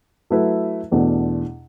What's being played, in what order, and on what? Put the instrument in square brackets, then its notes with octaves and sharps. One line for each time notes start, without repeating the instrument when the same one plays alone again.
[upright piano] F#3 A3 E4 B4
E2 B2 A3 D4